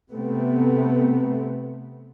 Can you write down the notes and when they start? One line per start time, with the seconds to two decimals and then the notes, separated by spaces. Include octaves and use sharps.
0.12 C3 A3 B3 C4